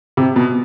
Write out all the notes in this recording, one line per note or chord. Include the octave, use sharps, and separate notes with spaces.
C3
B2